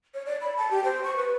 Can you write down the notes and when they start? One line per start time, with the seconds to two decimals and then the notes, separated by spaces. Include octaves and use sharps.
0.14 C#5
0.26 D5
0.41 B5
0.57 A5
0.71 G4
0.84 C5
1.04 C#6
1.17 B4